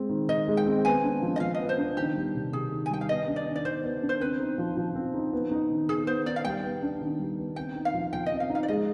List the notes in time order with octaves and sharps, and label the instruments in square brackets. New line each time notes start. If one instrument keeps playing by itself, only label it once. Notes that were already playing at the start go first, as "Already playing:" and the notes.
Already playing: [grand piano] G#3 C4
D#3
[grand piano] D#3 [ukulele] D#5
[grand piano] G#3
[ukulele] G5
[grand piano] C4
[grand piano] B3 [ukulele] G#5
[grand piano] D4
F3
[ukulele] D#5
[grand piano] F3 [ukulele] F5
[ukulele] D#5
[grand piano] B3
[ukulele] C5
[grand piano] D4
[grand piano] D#3 [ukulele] G4
[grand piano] G3
C3
[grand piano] C3 [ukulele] G#4
[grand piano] D#3
[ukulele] G#5
[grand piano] G3 [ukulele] G5
[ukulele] F5
[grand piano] B3 [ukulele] D#5
[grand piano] D4
[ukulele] D5
[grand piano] D#3
[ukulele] D5
[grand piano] D#3 [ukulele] C5
[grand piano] B3
D4
[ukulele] C5
[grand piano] C4 [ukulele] B4
[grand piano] D#4
F3
F3
C4
D#4
B3
D#4
D#3
[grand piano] D#3 [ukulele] G#4
[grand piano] B3 [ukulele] C5
[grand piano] D#4 [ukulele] D5
[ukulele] F5
[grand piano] G3 [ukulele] G5
[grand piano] B3
D4
D#3
G3
B3
[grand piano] C4 [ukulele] G5
[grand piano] D#4
[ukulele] F5
[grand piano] F3
[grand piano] F3 [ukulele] G5
[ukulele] D#5
[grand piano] C4
[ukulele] F5
[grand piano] D#4
[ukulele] F5
D5
[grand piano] G#3 [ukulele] D#5